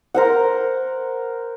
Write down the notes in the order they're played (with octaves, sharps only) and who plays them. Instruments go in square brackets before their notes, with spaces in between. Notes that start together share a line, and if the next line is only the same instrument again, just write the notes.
[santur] A#4 C5 F#5